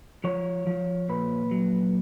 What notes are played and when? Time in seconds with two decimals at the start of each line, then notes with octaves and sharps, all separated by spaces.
0.24 F3 C#5
0.67 F3
1.09 A#2 B4
1.51 F#3